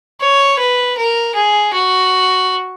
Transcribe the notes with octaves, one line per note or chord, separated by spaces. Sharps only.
C#5
B4
A#4
G#4
F#4